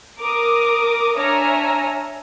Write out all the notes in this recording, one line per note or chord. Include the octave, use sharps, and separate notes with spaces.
A#4 D6 D#6
D4 C#5 E5 G#5 A#5 F6